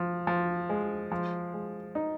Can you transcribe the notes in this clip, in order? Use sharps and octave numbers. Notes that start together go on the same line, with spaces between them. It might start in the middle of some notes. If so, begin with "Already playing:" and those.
Already playing: F3
F3
G#3
F3
G#3
D#4